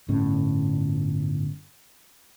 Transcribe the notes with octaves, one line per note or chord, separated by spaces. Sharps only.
G1 A2 C#4